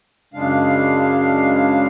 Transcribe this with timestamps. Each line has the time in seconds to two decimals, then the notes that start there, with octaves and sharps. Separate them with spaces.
0.34 F#2 C#3 G#3 D4 F5